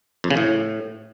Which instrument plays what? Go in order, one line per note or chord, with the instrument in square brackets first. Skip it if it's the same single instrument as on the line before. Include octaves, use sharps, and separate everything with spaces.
[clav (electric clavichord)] F2
C#3
A2